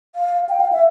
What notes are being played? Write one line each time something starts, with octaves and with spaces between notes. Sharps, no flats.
F5
G5
F5
E5